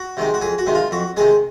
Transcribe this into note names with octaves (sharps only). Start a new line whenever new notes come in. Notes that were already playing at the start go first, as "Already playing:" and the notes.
Already playing: F#4
C3 D#3 G#3
F#4
F2 G#4
F#4
C3 D#3 G#3
F4
F2 F#4
C3 D#3 G#3 G#4